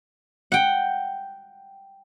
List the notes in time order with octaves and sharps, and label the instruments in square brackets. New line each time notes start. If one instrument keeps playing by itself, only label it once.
[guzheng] F#5 G5